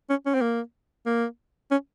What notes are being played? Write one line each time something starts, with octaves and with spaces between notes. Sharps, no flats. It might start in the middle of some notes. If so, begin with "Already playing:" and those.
C#4
C#4
C4
A#3
A#3
C#4